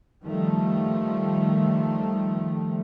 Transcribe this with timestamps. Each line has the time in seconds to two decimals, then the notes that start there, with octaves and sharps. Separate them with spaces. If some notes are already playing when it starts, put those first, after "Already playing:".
0.25 D#3 F3 G3 A3